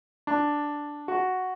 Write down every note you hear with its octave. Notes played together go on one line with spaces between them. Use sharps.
D4
F#4